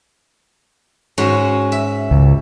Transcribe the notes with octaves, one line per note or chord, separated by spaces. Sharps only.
G#2 C#4 F#4
E5
C#2